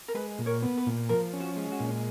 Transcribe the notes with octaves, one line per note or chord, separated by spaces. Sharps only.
A#4
G#3 B4
A#2
A#4 C#5
B3
B4
A#2
F3 A#4
C#4
F#4
G#3
F#4
A#2